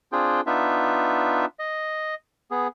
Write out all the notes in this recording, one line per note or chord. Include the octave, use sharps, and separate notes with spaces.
C4 D4 F4 G#4 G5
B3 D4 D#4 F4 E5
D#5
B3 G#4